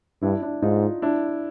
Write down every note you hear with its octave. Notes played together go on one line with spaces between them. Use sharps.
G2 D4 E4
D4 E4
G#2 D#4 F4
D4 E4